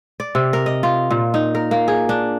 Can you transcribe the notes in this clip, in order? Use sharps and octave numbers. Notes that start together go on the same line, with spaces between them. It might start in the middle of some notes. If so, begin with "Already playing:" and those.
D5
C3
A#4
D#5
F4
A#2
D#4
A#4
A#3
G#4
D4